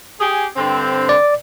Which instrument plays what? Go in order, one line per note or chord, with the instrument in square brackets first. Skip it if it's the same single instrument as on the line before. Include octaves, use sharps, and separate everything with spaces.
[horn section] G4 G#4
G2 D3 C4
[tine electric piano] D5